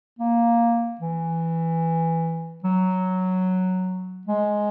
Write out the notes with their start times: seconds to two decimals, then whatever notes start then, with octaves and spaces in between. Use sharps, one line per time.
0.19 A#3
1.01 E3
2.64 F#3
4.27 G#3